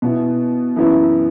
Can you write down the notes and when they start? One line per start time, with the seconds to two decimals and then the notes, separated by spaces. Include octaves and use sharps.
0.02 B2 B3 E4
0.76 F#2 E3 B3 E4